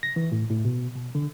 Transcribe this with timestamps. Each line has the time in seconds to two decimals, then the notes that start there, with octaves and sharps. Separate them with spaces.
0.03 A#6
0.16 E3
0.32 A2
0.50 A2
0.65 B2
0.95 B2
1.15 D3